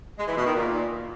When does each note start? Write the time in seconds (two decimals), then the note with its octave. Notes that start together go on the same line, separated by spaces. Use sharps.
0.18 G#3
0.28 E3
0.37 B2
0.46 D#3
0.55 A#2